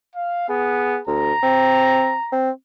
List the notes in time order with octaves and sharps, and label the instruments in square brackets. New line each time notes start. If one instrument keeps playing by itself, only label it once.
[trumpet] F5
[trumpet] B3 [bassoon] G#4
[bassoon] D2 [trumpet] A#5
[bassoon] C4
C4